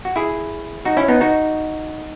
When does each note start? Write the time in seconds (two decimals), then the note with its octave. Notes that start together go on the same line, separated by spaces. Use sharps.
0.05 F#4
0.16 E4 G#4
0.85 D#4 F#4
0.97 C#4 E4
1.08 B3 D#4
1.21 D#4 F#4